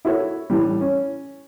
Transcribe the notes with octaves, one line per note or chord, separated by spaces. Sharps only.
E4 F#4 A4 C#5
A2 E3 G3
C#4